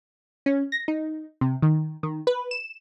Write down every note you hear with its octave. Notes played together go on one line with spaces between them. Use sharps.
C#4
A#6
D#4
C3
D#3
D#3
B4
E7